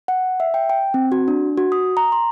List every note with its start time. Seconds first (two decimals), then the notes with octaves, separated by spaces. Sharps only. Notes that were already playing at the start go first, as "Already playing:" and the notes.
0.08 F#5
0.40 E5
0.54 G5
0.70 G5
0.94 C4
1.12 F#4
1.28 D4
1.58 F#4
1.72 D#6
1.97 A#5
2.12 C6